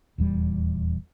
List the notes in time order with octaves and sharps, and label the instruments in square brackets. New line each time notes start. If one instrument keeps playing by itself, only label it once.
[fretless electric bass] D#1 E2 G3